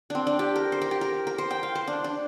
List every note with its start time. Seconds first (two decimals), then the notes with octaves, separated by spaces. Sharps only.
0.10 C4 D4
0.27 D4
0.39 G4
0.56 A#4
0.72 C5
0.82 A#4
0.91 G4
1.01 A#4
1.27 A#4
1.38 C5
1.51 G5
1.63 F5
1.75 C5
1.88 D4
2.04 D4